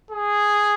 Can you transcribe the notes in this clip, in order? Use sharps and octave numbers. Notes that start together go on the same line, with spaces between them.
G#4